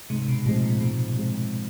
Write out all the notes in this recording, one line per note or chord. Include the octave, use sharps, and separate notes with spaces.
G#2 C3
B2
A2 F3 G#3 C4
A#2
G#2 B2
F3 G#3 C4